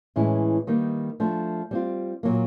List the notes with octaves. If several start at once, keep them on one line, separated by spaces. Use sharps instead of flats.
A2 E3 G#3 C#4 E4
D#3 G3 A#3 D#4
F3 A3 D4
G3 C4 F4
A#2 F#3 A#3